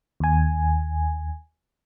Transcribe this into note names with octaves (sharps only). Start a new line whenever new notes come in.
D#2 G#5